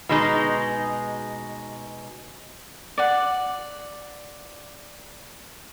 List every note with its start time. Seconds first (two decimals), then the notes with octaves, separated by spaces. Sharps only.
0.09 B2 G#3 D#4
2.98 D5 F#5